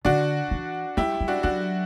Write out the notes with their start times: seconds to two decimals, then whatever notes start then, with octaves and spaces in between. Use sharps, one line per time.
0.05 D3 D4 F#4
0.51 E3
0.97 G3 E4 G4
1.21 G3
1.28 D4 F#4
1.43 F#3 D4 F#4